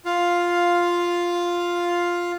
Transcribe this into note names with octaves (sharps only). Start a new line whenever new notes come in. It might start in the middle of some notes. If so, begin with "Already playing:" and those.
F4 F5